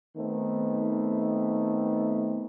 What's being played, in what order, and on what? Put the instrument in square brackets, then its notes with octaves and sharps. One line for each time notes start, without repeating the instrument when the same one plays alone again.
[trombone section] D#3 A3 B3 C4